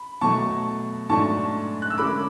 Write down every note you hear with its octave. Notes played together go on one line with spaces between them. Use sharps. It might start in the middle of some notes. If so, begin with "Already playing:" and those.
Already playing: B5
B2 F#3 A3 A5 C#6
G#2 F#3 A3 D4 A5 C#6
F#6
E6
D3 G#3 C#4 B5 D6